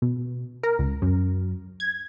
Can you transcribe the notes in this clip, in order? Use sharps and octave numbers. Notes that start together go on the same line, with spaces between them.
B2
A#4
C#2
F#2
G#6